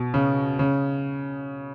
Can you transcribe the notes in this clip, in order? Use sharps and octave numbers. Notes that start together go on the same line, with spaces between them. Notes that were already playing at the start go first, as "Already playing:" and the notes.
Already playing: B2
C#3
C#3